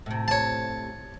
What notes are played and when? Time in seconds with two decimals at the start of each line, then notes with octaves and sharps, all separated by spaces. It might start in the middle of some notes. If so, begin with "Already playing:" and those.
0.06 A2 C3
0.28 C#5 A5